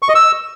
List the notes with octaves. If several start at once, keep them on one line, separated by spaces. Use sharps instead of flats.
C#6
D#5
E6